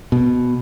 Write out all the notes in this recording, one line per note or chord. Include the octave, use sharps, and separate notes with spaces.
B2